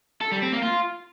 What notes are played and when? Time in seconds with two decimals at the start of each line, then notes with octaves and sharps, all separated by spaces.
0.21 A4
0.32 G3
0.42 C4
0.52 A#3
0.63 F4